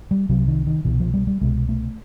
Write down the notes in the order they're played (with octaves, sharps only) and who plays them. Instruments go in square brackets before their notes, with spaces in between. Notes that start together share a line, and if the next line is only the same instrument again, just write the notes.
[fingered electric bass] G3
C2 C3 F#3
D#3
D#3
C2 B2 E3
F3
G3
G3
C2 B2 G#3
A3